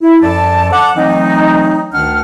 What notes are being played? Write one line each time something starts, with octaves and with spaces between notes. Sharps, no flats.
E4
F#2 F3 A4 D5 A5
F#5 A5 D6
E3 F#3 A3 C4 D#4
D2 D#3 D4 F#5 F6